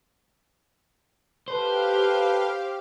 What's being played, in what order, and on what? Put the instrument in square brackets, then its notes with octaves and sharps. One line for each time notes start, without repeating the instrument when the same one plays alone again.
[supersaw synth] G4 F5 [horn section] A4 B4 [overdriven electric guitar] C5